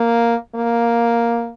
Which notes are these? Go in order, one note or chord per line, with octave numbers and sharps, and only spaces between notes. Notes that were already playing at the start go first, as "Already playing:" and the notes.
Already playing: A#3
A#3